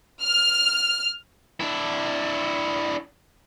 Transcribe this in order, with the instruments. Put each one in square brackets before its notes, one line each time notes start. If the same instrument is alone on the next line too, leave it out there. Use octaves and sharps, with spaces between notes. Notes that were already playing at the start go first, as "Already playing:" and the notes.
[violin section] F6
[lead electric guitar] D4 E4